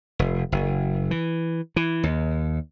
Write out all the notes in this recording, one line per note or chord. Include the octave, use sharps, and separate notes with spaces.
F1
F#1
E3
E3
D#2